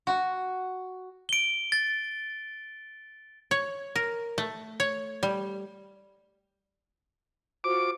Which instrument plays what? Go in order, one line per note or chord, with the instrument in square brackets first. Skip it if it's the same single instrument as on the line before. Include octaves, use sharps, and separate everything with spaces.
[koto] F#4
[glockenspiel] D7 G7
A6
[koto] C#5
A#4
A3
C#5
G3
[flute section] F4 F#4 C5 [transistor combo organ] D6